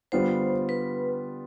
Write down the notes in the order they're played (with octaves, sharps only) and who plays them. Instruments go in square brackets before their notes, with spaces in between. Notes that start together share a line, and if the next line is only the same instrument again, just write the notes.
[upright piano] D3 G3 B3 F4 [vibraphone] C5
[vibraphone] B4